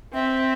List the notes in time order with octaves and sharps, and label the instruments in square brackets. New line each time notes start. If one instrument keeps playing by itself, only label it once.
[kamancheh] C4 [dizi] E5